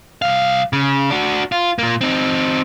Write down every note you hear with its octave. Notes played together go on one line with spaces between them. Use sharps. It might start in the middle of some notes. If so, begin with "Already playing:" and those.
C2 F5
C#3
D4 F#4
F4
A#2 A#3
C4 D#4